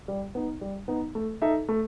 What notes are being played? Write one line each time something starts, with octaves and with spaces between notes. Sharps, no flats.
G3
B3 D#4
G3
B3 D#4
A3
D#4 A4 E5
A3